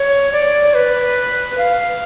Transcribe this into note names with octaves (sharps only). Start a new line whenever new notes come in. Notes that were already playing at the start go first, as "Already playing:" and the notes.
Already playing: C#5
D5
B4
F5